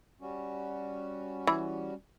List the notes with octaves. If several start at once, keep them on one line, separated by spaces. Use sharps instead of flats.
G3 C#4 F#4
E3